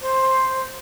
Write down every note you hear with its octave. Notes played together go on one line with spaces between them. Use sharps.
C5